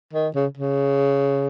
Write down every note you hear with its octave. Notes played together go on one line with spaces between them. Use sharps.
D#3
C#3
C#3